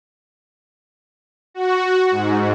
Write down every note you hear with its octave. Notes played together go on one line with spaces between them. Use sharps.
F#4
G#2